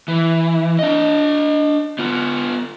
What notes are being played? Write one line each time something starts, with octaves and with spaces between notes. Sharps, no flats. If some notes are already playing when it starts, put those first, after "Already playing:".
E3
D4 D#5
B3 F4